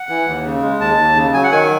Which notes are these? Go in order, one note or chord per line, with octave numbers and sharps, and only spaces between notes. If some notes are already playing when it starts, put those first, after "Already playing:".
Already playing: F#5
E3
D#2
C#3
G#3
D#2 A5
D#2
C#3
F#3 G#5
F#5
D#3 G#5